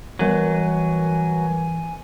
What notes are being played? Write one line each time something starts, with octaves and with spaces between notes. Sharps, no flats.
E3 F#3 G3 A#4 G#5 D#7